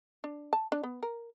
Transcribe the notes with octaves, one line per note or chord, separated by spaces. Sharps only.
D4
A5
D4
B3
A#4